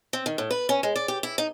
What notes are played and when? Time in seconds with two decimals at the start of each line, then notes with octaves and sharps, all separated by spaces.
0.13 C4
0.26 D#3
0.38 A2
0.51 B4
0.69 C#4
0.83 G#3
0.96 D5
1.08 G4
1.23 E4
1.38 D#4